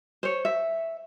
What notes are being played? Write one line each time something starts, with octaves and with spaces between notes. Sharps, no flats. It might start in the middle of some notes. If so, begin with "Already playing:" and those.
C5 C#5
E5